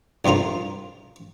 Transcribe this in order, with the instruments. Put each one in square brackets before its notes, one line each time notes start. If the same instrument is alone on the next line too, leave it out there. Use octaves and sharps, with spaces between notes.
[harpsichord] C2 G2 F3 F4 A#4